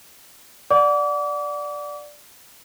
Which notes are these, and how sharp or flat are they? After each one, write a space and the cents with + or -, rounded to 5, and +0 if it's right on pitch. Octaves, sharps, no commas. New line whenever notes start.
D5 +0 F#5 -15 D6 -35